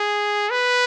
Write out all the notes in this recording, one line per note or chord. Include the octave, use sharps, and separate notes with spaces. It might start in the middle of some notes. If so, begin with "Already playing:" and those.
Already playing: G#4
B4